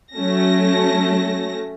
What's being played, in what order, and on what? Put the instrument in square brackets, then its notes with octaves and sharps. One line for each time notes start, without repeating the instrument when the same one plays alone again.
[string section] F#3 A3 C#4 A5 A#6